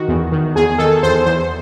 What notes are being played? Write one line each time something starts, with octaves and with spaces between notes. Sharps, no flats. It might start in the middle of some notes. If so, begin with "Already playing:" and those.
Already playing: D#3 F#4
E2
D#3
E2 G#4
D#3 A4
E2 C5
E2 C5